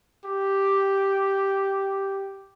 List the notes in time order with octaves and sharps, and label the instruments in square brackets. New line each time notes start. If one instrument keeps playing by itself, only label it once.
[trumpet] G4